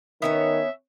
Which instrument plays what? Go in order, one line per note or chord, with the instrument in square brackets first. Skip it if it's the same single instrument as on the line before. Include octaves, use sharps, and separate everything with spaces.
[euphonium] D#3 [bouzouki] B3 C#4 C#5 [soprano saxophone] E5